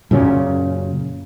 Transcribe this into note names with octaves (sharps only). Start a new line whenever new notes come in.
F#2 A#2 C#3 C#4